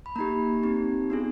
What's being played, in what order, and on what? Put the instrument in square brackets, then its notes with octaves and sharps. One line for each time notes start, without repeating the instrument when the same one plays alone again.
[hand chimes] B5
A#3 D#4 G4 A#5
C4 D#4 G4
B3 D4 F4 G#4